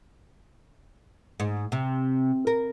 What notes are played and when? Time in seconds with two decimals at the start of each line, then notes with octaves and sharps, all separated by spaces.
1.40 G#2
1.72 C3
2.47 A#4